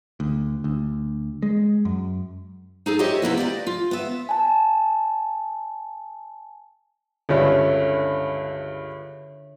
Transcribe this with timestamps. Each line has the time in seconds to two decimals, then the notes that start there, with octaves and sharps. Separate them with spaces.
0.20 D2
0.64 D2
1.42 G#3
1.85 F#2
2.86 D#4 G#4 A4
2.99 G4 A4 C5 C#5 D#5 E5
3.22 C3 A#3 B3 E4
3.37 G4 D5 D#5
3.67 F4
3.91 B3 E5
4.29 G#5 A5
7.29 C#2 G2 D3 C#5 E5